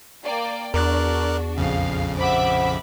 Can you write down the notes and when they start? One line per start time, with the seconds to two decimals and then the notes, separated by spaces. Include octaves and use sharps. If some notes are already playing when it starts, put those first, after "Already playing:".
0.24 A#3 D5 G5
0.74 E2 D4 F#4 A#4 D5 F#6
1.57 A#1 F2 C#3 F5
2.18 C5 E5 F#5 B5 D6